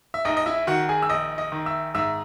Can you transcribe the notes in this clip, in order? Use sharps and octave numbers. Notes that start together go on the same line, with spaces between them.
E5
A#1 D#4 D#5
D#5
E4 E5
D#3 F#4 F#5
G#4 G#5
E6
A#1 D#5 D#6
D#5 D#6
D#3
E5 E6
G#2 E5 E6